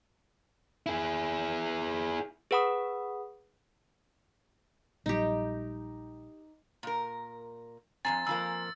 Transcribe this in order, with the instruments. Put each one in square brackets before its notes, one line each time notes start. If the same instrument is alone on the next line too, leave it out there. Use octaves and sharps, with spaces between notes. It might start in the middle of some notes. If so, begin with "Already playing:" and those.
[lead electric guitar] E4 G#4
[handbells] G#4 B4 F#5 B5 D#6
[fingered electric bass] A#1 F#3 G3 [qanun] D#4 G4
[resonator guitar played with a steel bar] A#2 A#4
[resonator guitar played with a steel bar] F2 A#2 C4 [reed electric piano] G#5 A#5 [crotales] A6
[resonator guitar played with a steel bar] F2 F3 A#3 [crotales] E6